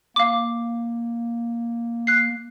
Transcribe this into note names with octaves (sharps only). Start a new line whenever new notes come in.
A#3 F5 D6
F#6 C7